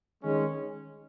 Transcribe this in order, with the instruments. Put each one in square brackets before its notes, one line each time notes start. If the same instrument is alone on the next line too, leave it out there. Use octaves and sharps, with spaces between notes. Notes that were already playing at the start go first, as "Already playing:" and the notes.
[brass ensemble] D#3 G#3 C#4